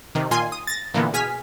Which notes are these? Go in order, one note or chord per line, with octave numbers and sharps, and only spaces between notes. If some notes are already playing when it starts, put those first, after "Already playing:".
C3 D#3
A#2 D#3 F4 G#5 C6
D#6
A6 A#6
A#2 D3 E3 A#3 B3
B2 G#4 G#5 F6 B6